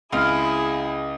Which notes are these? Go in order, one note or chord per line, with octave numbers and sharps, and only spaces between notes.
C#2 C4 E4 G#4 F5 F6